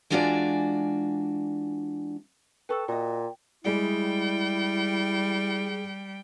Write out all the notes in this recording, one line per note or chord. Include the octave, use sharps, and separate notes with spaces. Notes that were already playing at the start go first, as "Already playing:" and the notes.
E3 G#3 D4 F4 F#4 D5
A4 B4 G5 C#6 E6
A#2 F#4 D#5 G5
G3 G#3 E4 G#4 D5 G5